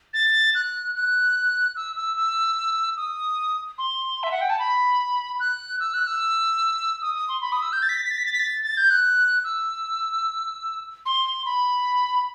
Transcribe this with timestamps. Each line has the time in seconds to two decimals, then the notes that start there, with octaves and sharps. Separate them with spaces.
0.14 A6
0.55 F#6
0.95 F#6
1.76 E6
1.96 E6
2.17 E6
2.97 D#6
3.78 C6
4.23 E5
4.32 F#5
4.41 G5
4.50 A5
4.59 B5
5.40 F#6
5.80 E6
5.94 F#6
6.07 E6
7.02 D#6
7.15 D#6
7.29 C6
7.42 B5
7.52 D#6
7.62 E6
7.73 G6
7.82 A6
7.89 B6
7.97 A6
8.04 B6
8.11 A6
8.18 B6
8.25 A6
8.33 B6
8.39 A6
8.63 A6
8.77 G6
8.90 F#6
9.44 E6
11.06 C6
11.46 B5